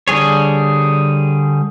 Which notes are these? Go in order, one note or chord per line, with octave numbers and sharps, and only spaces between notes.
D3 G3 G#4 C#5